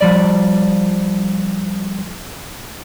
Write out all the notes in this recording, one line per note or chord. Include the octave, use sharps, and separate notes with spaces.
F3 G3 D5